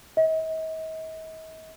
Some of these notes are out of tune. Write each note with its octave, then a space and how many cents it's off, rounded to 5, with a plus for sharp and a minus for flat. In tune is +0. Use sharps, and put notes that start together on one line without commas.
D#5 +45